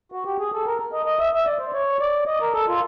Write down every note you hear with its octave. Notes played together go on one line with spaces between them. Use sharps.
F#4
G4
G#4
A4
A#4
D#5
D#5
E5
E5
D5
C5
C#5
D5
D#5
A#4
A4
F4